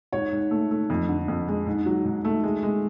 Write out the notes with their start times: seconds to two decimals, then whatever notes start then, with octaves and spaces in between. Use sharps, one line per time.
0.12 G#2 C#5
0.32 G#2
0.51 A3
0.71 A3
0.90 F2
1.09 D3
1.28 F2
1.48 G#3
1.66 G#2
1.86 F#3
2.05 G#2
2.25 A3
2.44 G#3
2.63 G#3